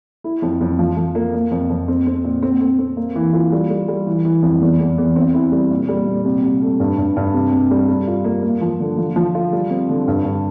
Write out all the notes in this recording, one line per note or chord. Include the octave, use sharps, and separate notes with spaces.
E4
F2
F2
F3
F3
A#3
A#3
F2
F2
C4
C4
A#2
C4
C4
C4
A#3
E3
F4
G3
G3
G3
E3
E3
F2
E2
E2
E2
C4
E4
G3
A#2
G3
A#2
C3
C3
A3
G2
G2
G2
C3
C3
G3
G3
F4
A#3
A#3
F3
D3
F3
F3
F4
G3
C4
D3
G2
G2